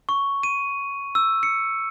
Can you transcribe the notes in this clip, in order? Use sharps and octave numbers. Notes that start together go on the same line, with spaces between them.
C#6
D#7
E6
C#7